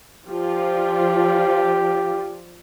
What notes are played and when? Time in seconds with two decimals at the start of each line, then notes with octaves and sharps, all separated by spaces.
0.27 F3 F4 G4 D5